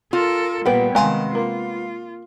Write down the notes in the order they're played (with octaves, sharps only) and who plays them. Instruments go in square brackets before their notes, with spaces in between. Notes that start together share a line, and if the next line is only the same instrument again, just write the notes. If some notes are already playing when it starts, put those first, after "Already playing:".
[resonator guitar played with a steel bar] F4 [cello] A4 A#4
[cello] A#2 G3 [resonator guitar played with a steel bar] B3 G5 [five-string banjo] G4 B4
[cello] C3 D#3 [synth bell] G#3 F5 C6 [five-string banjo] G#5 A#5
[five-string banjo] A#3 [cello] F4